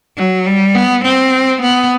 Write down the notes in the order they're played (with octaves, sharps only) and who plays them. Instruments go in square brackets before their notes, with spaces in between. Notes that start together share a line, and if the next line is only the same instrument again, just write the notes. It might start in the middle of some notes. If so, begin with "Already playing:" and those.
[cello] F#3
G3
B3
C4
B3